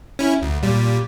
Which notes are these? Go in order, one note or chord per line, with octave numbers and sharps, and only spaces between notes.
C#4 E4
D2
A#2 G3